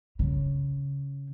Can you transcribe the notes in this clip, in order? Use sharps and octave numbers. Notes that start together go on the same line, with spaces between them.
C#3